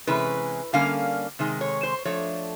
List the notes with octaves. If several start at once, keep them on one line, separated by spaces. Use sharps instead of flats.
C3 E3 G#3 C#4 B4
D3 G3 A#3 C#4 F5
C3 D#3 G#3
C#5
C5
F3 A3 D4 C#5